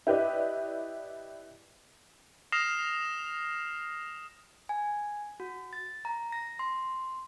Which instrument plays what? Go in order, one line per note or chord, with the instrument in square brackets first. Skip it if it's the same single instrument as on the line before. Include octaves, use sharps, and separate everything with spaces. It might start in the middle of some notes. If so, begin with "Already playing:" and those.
[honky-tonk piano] E4 G4 B4 D5 D#5
[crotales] D#6 F6 A#6 C7 E7 F7
[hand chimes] G#5
F#4
A6
A#5
A#6
C6